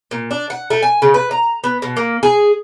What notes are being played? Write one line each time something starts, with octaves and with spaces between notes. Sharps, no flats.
A#2
D4
F#5
A3
G#5
C#3
B4
A#5
B3
B2
A#3
G#4